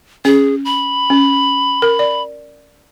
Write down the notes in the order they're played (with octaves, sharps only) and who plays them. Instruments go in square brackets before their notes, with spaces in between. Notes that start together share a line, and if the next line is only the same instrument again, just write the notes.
[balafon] C#4 [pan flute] G#4
[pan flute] B5
[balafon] C#4
A#4
D5